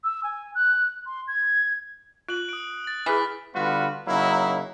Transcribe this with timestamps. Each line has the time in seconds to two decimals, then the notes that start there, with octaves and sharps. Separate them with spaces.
0.04 E6
0.24 G#5
0.55 F#6
1.06 C6
1.28 G#6
2.29 F4 F#6 F#7
2.49 D#6 D7
2.85 A6 F#7
3.06 E3 E4 G#4 F6 B6
3.54 D3 G3 B3 F4 F#4 B4
4.07 C#3 F#3 A#3 D#4 E4